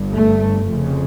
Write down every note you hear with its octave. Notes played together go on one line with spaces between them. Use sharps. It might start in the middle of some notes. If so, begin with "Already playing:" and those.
Already playing: G1 G2
A3
F1 F2 C#3